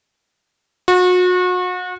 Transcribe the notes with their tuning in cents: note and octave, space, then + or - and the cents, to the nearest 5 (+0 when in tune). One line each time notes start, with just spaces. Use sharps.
F#4 -35